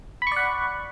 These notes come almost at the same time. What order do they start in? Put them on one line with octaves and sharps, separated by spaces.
B5 C#6 D5 F#5